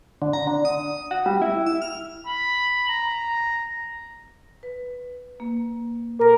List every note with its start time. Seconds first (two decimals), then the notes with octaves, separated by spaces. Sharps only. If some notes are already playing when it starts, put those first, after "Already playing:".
0.22 D3
0.33 A#5
0.47 D3
0.65 D#6
1.11 F#4
1.26 G3
1.42 E4
1.66 E6
1.82 F6
2.27 B5
2.89 A#5
4.63 B4
5.40 A#3
6.19 A#2 A4 A#4 A#6